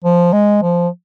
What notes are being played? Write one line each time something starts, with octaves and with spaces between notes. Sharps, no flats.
F3
G#3
F3